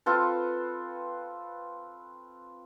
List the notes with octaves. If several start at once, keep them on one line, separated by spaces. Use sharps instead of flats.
C4 F4 A4 B4